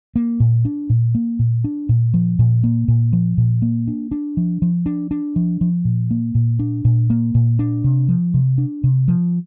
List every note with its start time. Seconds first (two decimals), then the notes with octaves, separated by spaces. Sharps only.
0.16 A#3
0.40 A#2
0.65 D4
0.90 A#2
1.15 A#3
1.39 A#2
1.64 D4
1.89 A#2
2.14 F3
2.39 A#2
2.64 A#3
2.88 A#2
3.13 F3
3.38 A#2
3.62 A#3
3.87 D4
4.11 D4
4.37 F3
4.62 F3
4.86 D4
5.11 D4
5.36 F3
5.61 F3
5.85 A#2
6.11 A#3
6.35 A#2
6.59 D4
6.85 A#2
7.10 A#3
7.35 A#2
7.59 D4
7.84 C3
8.09 F3
8.34 C3
8.58 D4
8.84 C3
9.08 F3